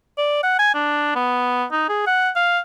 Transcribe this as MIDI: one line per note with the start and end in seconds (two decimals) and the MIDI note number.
0.18 0.42 74
0.43 0.56 78
0.59 0.74 80
0.75 1.14 62
1.16 1.65 59
1.72 1.84 63
1.89 2.06 68
2.07 2.30 78
2.36 2.59 77